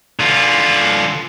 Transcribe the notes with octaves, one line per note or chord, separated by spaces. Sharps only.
D3 F4